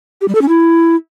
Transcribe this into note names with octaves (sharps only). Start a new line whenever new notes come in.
G4
G3
A4
C#4
E4